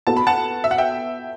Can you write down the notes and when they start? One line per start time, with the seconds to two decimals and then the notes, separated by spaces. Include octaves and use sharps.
0.07 B3 F#4 A4 A5
0.17 B5
0.27 F#5 A5
0.64 E5
0.71 F#5
0.78 E5 G5